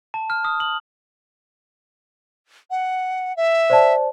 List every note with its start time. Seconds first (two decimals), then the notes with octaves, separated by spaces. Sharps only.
0.14 A5
0.30 F6
0.44 D#6
0.60 F#7
2.71 F#5
3.37 E5
3.70 C5 D5 A5